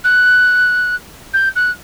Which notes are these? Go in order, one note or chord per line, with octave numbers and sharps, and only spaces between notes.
F#6
G6
F#6